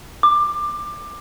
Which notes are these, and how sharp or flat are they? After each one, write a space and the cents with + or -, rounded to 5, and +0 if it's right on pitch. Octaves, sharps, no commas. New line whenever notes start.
D6 +20